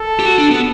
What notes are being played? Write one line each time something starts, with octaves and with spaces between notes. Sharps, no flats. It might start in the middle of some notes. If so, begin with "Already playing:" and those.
Already playing: A4
G4
F#4
D4
B3